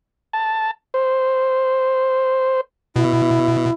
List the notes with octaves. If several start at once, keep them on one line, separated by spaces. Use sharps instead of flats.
A5
C5
B2 E4